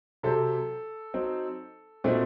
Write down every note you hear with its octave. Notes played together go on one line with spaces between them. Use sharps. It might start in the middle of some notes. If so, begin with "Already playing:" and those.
C3 F#3 C4 G4 A4 C5
F#3 C4 D#4
A#2 A3 C4 D#4 F#4